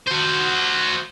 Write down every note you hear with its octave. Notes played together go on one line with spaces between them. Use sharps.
F#4 C5